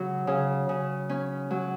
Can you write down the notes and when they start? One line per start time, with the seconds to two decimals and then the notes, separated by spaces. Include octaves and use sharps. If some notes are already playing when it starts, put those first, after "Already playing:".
Already playing: C#3 F#3 F#4
0.27 C#3
0.69 C#3
1.09 C#4
1.51 F#3